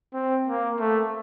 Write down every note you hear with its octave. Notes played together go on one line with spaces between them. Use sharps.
C4
A#3
A3